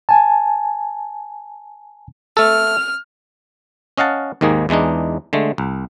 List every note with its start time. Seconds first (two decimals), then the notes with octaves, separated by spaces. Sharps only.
0.09 G#5 A5
2.37 A3 A4 F6
3.98 C#4 D#5 F5 F#5 A5
4.41 D#2 G#2 D#3 A#3 G#4
4.69 E2 E3 G#3 D4 D#4
5.33 D3 G#3 A3
5.58 C2